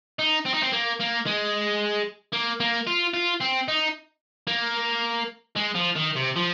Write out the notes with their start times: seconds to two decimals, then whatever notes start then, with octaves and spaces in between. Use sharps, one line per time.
0.19 D#4
0.45 C4
0.54 D#4
0.63 C4
0.72 A#3
1.00 A#3
1.26 G#3
2.33 A#3
2.60 A#3
2.87 F4
3.14 F4
3.41 C4
3.68 D#4
4.47 A#3
5.56 G#3
5.75 F3
5.96 D#3
6.16 C3
6.36 F3